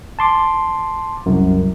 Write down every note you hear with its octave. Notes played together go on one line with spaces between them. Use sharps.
A5 C6 D6
C2 F#2